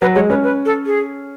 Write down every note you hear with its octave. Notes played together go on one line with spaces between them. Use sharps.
F#3 B4
G#3 C#5
C#4 B4
B4
A4
G#4